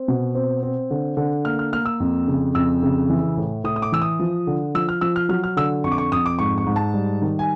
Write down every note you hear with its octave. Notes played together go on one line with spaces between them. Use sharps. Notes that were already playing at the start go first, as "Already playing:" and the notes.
Already playing: C4
B2
C4
C4
D3
D3
A#3 F6
F6
A#3 F6
E6
F2
C#3
F2 E6
C#3
E3
A2
A2 D#6
D#6
D6
E3 E6
D#6
F3
D3
F3 E6
F6
F3 E6
F6
F#3 F6
F6
D3 E6
F2 C#6
D6
C#6
F2 D#6
D6
G#2 C#6
C#6
G#2
A5
G3
D#3
G#5